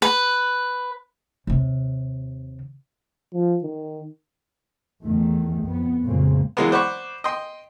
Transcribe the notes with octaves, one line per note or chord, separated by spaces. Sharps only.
B4
D#2 C3
F3
D#3
E2 D#3 A3
F2 B3
F2 A#2 C#3 G#3 A#3 C4
E3 F#3 G#3 A#3 B3
C5 D5 F#5 B5 C#6
D#5 G5 C6